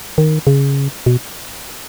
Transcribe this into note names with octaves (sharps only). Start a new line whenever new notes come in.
D#3
C#3
B2